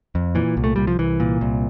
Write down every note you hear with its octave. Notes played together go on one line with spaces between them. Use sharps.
F2
A#2 E3
C2
A3
C2 G3
F3
C2 E3
A#2
C2